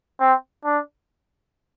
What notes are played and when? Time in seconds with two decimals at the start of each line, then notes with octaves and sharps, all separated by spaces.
0.20 C4
0.65 D4